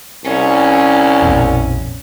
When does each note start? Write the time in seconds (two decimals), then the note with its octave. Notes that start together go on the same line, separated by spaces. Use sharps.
0.24 C2 C#4
1.22 A#1 F2 B2